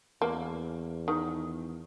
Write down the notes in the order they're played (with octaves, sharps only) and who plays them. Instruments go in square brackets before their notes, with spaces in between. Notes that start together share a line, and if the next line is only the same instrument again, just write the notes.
[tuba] E2 [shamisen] A#3
[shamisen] D#3